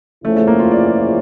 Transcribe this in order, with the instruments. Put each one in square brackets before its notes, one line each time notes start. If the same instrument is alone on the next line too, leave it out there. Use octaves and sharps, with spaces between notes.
[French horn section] E2 C#3 F3 C#4 E4 [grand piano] A3
[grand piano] A3
A#3
F4
D5